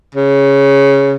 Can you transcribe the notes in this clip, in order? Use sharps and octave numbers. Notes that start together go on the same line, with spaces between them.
C#3